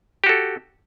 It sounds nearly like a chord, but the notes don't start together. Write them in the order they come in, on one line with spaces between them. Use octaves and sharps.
G4 F#4 A4